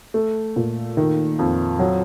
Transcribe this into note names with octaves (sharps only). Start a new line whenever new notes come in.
A3
A#2
D#3
F2
F#3